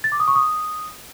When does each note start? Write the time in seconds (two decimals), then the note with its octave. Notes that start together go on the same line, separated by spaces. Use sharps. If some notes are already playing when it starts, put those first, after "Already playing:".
0.04 A6
0.12 D6
0.20 D#6
0.28 C#6
0.35 D#6